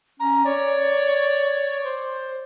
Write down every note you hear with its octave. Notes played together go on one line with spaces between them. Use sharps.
C#4 A#5
C#5 D5
C5